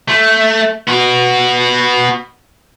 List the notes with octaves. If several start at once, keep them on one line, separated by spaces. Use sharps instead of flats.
A3
B3 F#4